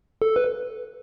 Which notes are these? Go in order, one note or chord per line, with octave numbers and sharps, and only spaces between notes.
A4
B4